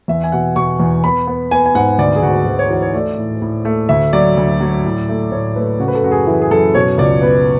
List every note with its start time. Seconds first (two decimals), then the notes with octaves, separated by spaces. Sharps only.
0.08 E2 E5
0.24 G#5
0.32 B2 F#5
0.56 B2 C#6
0.80 E2
1.04 B3 B5
1.27 B3
1.51 B3 G#5
1.66 G#5
1.75 G#2 F#5
1.99 D2 D5
2.16 G#4
2.22 D2 F#4
2.46 D2 F#4
2.59 C#5
2.70 E3 F#4
2.82 C#5
2.94 A3 D5
3.18 A2
3.42 A2
3.65 A3
3.89 D2 E5
4.13 F#3 D5
4.37 D2
4.60 F#3
4.85 A2
5.09 A3
5.32 A2 C#5
5.56 A3 B4
5.80 C#3 F#4
5.88 B4
5.95 A4
6.03 F#2 F#4
6.11 G#4
6.27 E3 E4
6.42 G#4
6.51 F#2 A4
6.74 B2 C#5
6.98 C#2 D5
7.22 B3 B4